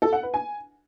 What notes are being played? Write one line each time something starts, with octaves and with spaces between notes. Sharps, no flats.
A4
F#5
B4
G#5